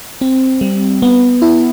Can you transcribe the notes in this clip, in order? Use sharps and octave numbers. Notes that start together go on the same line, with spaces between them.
C4
G3
B3
E4